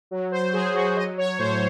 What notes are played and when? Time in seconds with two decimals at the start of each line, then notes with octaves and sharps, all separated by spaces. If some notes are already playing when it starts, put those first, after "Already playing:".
0.11 F#3
0.32 C5
0.53 F#3 G#4
0.74 F#4
0.96 F#3 D#5
1.18 C#5
1.39 A2 C5